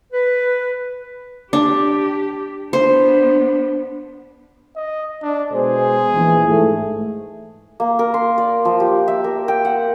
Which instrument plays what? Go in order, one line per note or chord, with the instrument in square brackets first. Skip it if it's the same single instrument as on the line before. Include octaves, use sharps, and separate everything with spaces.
[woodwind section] B4
[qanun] D4 [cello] G4
[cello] B3 D4 [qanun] C5
[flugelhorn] D#5
D4
[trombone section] B2 G#3 C5 [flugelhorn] G#4
[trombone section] A#1 E3
G#2 A3
[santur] A#3
A#4
C6
D5
F3
G4
E5
A#4
G5
F#5